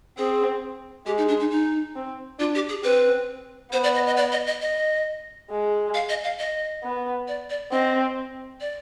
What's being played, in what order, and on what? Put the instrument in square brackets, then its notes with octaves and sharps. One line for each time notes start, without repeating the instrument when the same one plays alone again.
[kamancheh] C4 [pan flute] G#4
[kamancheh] G#3 [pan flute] G4
[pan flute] D#4
D4
D#4
D#4
[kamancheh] C4
[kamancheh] D4 [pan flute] F4
[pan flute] G4
G#4
[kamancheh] C4 [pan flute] B4
[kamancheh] B3 [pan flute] C5
[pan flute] D5
D#5
D#5
D5
D#5
D#5
D#5
[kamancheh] G#3
[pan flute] F5
D#5
F5
D#5
[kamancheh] B3
[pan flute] D5
D5
[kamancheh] C4 [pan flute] D#5
[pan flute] D5